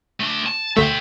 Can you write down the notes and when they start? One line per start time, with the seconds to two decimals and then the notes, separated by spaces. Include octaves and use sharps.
0.20 A3 D4
0.46 A5
0.77 D2 A3 E5 G5